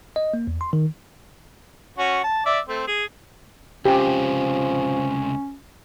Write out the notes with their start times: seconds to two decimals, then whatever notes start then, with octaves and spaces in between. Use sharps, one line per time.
0.16 D#5
0.34 A#3
0.47 E2
0.61 C6
0.73 D#3
1.98 C#4 F#4
2.24 A5
2.46 D5 E5
2.68 A3 C4
2.87 G#4
3.85 C#2 C3 F3 C#4 G4